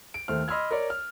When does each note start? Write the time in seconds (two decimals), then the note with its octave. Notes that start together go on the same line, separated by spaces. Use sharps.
0.14 D7
0.28 D#2 A3 C5 F6
0.48 D#5 B5 C6 E6 F6 G#6
0.71 A#4 C#5 D5
0.90 F6